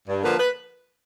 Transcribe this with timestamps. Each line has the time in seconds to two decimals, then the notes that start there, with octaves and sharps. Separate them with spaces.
0.07 G2
0.23 D3 F3 A#3 B4
0.38 B4